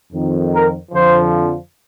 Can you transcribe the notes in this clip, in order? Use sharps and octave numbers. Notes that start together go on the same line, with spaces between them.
F2 D#3
A#4
F2 D3 F3 C5